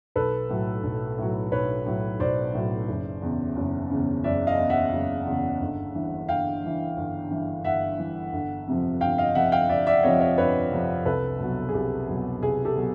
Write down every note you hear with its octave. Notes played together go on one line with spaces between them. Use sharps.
B1 A4 B4
A2 F#3
B1
A2 F#3
B1 B4 C#5
A2 F#3
B1 C5 D5
A2 F#3
F#1
E2 C#3
F#1
E2 C#3
F#1 D5 E5
D#5 F5
E2 C#3
E5 F#5
F#1
E2 C#3
G1
G2 E3
G1 F5 G5
G2 E3
G1
G2 E3
G1 E5 F#5
G2 E3
G1
F2 C3 F3
G1 F5 G5
D#5 F5
F2 C3 F3 E5 F#5
F5 G5
G1 D5 E5
D5 E5
F2 C3 F3 C#5 D#5
C#5 D#5
G1 B4 C#5
F2 C3 F3
C2 A4 B4
B2 F#3
G#4
C2 G4
B2 F#3
C2 G#4
G4 A4
B2 F#3